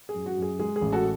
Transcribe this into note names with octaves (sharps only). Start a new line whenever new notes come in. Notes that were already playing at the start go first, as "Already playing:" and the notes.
G#4
F#2
F#4
F#2
G#4
G#3 G#4
G#4
A1
F#4 A4